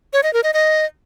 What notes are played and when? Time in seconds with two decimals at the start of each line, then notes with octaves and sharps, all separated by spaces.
0.13 C#5
0.23 D#5
0.33 A#4
0.43 D#5
0.54 D#5